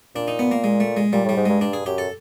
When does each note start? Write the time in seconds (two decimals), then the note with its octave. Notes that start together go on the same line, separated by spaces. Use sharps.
0.15 A#2 D4
0.28 D#4
0.39 B3
0.51 A#3
0.64 G#3
0.80 A3
0.97 G#3
1.13 A#2 G3
1.25 A2 G3
1.37 G#2
1.45 G2 G#3
1.61 G2 D4
1.73 G#4
1.86 F#2 G4
1.98 A4